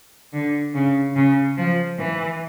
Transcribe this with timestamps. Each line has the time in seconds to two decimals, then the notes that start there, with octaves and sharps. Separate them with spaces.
0.34 D3
0.75 C#3
1.16 C#3
1.58 F3
1.99 E3